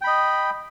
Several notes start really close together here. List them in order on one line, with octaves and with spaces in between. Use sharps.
G5 B5 D#5